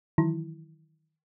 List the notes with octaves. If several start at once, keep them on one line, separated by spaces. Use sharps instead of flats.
D#3 E3 F#3 E4